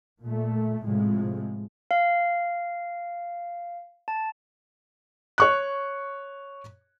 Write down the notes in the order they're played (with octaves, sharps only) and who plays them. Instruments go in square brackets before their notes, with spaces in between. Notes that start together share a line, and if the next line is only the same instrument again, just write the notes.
[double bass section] A#2 A3
A2 C3 F3 G#3
[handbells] F5
A5
[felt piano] C#5 C#6 F#6